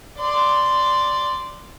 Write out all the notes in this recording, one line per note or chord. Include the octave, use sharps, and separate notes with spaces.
D5 C6